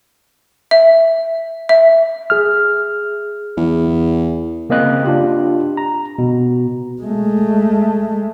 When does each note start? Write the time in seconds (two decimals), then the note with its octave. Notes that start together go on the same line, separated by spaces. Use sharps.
0.71 E5
1.69 E5
2.30 G#4 F6
3.57 E2
4.70 C#3 A#3 C4 D#5 F#6
5.05 D4 F4 G4
5.77 A#5
6.18 B2
7.02 G#3 A3